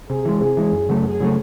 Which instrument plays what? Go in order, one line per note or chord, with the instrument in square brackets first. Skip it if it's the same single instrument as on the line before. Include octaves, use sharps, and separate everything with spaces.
[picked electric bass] C3 [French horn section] G#4
[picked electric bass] E3 G#3
[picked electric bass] C3 [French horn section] G#4
[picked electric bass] E3 G#3
F#2
C#3 F#3 A3
[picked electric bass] F#2 [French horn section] G#4
[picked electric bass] C#3 F#3 A3